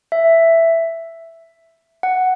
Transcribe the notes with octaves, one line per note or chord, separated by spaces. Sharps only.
E5
F#5